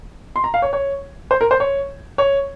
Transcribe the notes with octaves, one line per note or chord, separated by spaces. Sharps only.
C6
A#5
F5
C#5
C#5
C5
A#4
C5
C#5
C#5